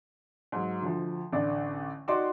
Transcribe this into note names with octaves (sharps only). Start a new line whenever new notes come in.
G#2 F#3
D2 F3
A1 D3 D4 D5
D#4 F#4 G4 D5 C6 D6